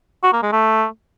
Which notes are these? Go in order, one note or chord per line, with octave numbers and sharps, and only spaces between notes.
F#4
A#3
G#3
A3